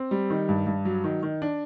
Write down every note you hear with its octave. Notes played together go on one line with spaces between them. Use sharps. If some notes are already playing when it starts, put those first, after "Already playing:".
Already playing: C4
G3
D#3
G2
G2
F#3
D#3
D#3
D4